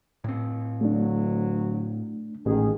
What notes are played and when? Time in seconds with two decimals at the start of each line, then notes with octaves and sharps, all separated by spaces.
0.24 A2 C4
0.81 D2 F#3 A3 D4
2.46 A1 G#2 D#3 G#4